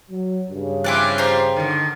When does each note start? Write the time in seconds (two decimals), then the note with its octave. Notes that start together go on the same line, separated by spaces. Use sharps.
0.10 F#3
0.51 G2 C#3
0.84 F3 C4 C#4 E4 D6 F#6
1.18 G4 C5 A#5
1.56 D3 D#3